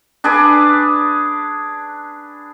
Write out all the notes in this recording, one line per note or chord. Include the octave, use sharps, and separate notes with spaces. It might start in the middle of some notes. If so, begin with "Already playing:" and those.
D4 G#4 B4 D5